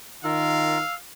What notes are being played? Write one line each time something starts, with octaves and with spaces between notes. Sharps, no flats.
D#3 F4 A#4 F5 E6